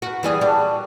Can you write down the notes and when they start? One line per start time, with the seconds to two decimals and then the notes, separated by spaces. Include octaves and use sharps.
0.02 F#4 A#4 B4
0.23 E3 G3 G#4
0.41 G3 D4 F#4 A4